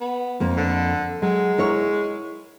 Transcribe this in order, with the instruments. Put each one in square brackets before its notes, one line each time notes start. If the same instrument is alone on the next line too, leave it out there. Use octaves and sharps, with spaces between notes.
[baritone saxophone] B3
[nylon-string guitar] F2 A#3
[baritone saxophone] D3
[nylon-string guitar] F#3 [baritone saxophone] G#3
[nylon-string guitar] E4 A#4 C#5